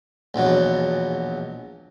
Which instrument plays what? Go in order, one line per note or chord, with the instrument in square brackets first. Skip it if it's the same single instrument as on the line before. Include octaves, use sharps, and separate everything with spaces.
[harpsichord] A#1 E2 B2 F#3